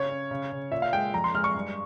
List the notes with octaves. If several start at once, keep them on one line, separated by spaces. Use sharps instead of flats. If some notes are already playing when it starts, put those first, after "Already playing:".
Already playing: C#3 C#5
C#4
C#3
C#3
A#2 E5
F5
G#3 G5
F2 A#5
C6
G#3 F6
C#6
G2